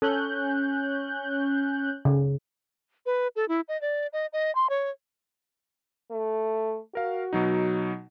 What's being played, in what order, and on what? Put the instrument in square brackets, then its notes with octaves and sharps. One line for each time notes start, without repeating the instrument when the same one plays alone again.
[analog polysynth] C#4 F#6 G6 [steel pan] A4
[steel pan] C#3
[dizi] B4
A4
E4
D#5
D5
D#5
D#5
C6
C#5
[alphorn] A3
[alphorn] F#4 [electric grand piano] A#4 F5
[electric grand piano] B2 F#3 D#4